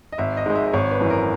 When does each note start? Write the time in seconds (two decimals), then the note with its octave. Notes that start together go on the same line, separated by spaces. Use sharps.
0.12 D#5
0.18 G#1 E5
0.37 D#5
0.46 G#2 D#3 G#3
0.55 E5
0.73 G#1 C#5
0.91 B4
1.01 F#2 E3
1.10 A#4